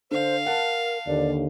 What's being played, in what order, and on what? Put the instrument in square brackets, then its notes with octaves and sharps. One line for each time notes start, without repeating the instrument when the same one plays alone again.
[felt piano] D3 [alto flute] C5 [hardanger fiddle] F5
[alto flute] A#4 [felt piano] F#5 A5
[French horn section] D#2 D3 [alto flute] D5